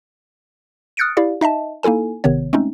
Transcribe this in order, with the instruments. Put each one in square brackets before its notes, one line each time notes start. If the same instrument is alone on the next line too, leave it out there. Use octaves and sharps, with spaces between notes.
[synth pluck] D#6 F6 F#6 A6 C#7 D7
E4 G4 D5 F5
D#4 D#5 E5 A5
A#3 D#4 E4 A4 G#5
G#1 C3 D#3 B3 C#5
G#3 A3 C4 C#4 D#4